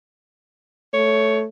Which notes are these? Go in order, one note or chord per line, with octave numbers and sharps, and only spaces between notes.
A3 C#5